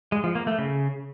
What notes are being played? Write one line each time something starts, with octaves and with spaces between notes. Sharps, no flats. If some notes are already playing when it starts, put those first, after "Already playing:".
G#3
F3
A#3
A3
C#3